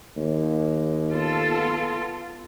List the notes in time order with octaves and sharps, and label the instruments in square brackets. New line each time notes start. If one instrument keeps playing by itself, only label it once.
[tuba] D#2
[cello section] B3 F4 A4